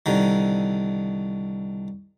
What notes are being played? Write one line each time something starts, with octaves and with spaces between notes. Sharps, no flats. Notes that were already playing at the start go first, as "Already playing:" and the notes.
C2 D3 D#3